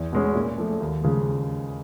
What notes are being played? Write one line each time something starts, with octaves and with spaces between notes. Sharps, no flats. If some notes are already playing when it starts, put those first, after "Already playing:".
Already playing: E2
B2 G#3 C#4
A#2
F3 A3
D#2
C#3 F3 G#3